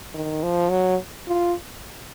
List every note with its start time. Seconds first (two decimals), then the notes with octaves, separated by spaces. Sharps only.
0.14 D#3
0.43 F3
0.70 F#3
1.28 F4